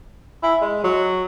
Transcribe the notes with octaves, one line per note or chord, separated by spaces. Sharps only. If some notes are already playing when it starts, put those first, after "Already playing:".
E4
G#3
F#3